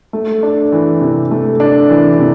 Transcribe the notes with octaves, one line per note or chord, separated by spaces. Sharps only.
A3
D4
E3
C3
A3
D4
E3
C3